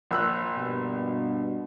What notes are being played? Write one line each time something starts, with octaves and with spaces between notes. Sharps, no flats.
A#1 E6 F#6
G2 B2